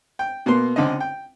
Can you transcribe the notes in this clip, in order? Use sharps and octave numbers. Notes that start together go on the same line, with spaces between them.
G5
B2 A#3 B3 C6
C#2 D3 C4 D#5
G5